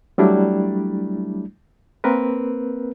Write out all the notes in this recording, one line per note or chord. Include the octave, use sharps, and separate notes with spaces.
F#3 G3 A3 D4 E4
A#3 C4 A#4 B4